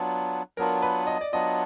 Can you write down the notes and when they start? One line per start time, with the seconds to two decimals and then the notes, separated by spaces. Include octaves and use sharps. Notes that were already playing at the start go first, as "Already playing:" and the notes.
Already playing: F#3 B3 D4 F4
0.57 F#3 B3 D4 F4 A#4
0.82 B4
1.07 D#5
1.21 D5
1.33 F#3 B3 D4 F4 D#5